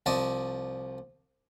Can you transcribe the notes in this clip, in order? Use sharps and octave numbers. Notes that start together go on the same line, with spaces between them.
C2 F3 D5 D#5 A5